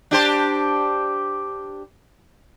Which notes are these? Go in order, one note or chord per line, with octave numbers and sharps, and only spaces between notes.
D4 G4 C5